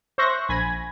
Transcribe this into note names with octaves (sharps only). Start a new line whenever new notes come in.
C5 E5 C#6 F#6 A#6
A#1 G#5 B5 G#6 A#6